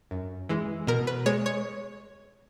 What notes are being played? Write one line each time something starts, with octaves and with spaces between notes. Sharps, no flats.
F#2
E3 G#3
B2 A#4
B4
G#3 C#5
C#5